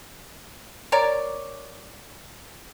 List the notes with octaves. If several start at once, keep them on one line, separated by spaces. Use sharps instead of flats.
A#4 C#5 D5